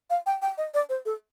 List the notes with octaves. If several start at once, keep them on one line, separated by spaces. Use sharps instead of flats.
F5
G5
G5
D#5
D5
C5
A4